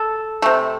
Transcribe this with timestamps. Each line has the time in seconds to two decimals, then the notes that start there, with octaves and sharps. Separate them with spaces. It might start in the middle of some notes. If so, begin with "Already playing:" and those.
Already playing: A4
0.42 C3 A3